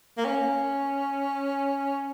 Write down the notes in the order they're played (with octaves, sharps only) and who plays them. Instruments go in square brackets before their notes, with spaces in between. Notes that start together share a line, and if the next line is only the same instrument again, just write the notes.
[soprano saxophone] A#3
C#4